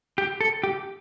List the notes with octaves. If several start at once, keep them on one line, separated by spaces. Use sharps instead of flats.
G4
A4
G4